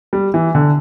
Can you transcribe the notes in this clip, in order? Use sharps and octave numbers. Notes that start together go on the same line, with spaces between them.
G3
E3
D3